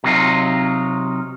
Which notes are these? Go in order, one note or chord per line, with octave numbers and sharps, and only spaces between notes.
C3 F#3 D#4 F4